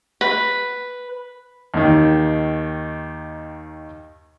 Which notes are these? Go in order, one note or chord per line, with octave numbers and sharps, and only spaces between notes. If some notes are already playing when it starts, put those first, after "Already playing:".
B4
D#2 D#3